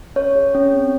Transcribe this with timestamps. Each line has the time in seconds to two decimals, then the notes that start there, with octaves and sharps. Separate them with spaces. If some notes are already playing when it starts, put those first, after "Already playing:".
0.16 C#4 C#5
0.35 G#4
0.55 C#4
0.73 C4